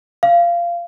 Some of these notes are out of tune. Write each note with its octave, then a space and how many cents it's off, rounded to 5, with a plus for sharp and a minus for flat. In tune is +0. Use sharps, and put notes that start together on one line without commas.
F5 -15